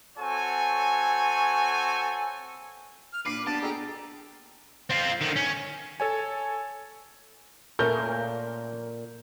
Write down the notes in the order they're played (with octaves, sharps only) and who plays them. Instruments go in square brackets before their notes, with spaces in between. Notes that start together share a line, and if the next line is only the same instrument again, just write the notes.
[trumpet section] C4 F#4 A4 C#5 G#5
[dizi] F6
[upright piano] A#2 C7 [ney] D4 [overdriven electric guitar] B4 [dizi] D6
[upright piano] B3 A6 [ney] D4 [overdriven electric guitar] G4 [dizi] A5
[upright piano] G#4 A4 G5 [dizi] A#5
[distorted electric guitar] C4 F4
D3 D#3
C#4
[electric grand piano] A4 C#5 G#5
[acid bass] A#2 [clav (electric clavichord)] A3 C#4 [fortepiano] A#4 [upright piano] G6